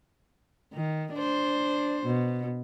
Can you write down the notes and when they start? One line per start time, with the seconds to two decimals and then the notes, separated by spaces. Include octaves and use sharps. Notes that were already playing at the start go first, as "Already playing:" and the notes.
0.74 D#3
1.15 D4 C5
2.06 B2